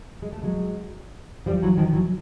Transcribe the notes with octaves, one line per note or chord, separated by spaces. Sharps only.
G#3
A3
F#3 G#3
F3 G3
E3 F#3
D#3 F3
E3 F#3